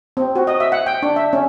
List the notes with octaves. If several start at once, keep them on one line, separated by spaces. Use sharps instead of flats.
C4
F#4
D#5
E5
F#5
G5
D4
E5
C#4